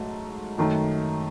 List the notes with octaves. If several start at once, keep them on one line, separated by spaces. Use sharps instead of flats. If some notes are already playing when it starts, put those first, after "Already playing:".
Already playing: G#2 F#3 A3
F#2 D#3 A3